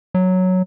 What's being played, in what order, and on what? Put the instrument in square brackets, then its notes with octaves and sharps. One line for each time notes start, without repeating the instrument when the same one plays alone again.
[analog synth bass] F#3